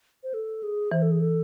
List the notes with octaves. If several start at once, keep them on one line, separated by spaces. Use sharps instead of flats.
C5
A4
G#4
E3 C5
A4
G#4
A4